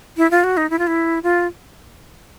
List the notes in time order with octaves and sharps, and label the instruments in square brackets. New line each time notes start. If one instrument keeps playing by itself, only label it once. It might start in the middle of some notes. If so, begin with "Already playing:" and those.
[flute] E4
F4
F#4
D#4
E4
F4
E4
F4